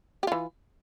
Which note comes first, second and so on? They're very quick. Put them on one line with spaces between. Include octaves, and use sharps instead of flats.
G4 F4 E3